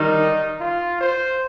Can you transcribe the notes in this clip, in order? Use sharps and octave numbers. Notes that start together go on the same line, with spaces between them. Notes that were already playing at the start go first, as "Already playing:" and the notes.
Already playing: D#3 G3 D#4
F4
C5